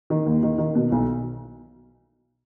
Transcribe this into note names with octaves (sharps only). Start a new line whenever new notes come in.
D#3
D#2
D#3
D#3
B2
B1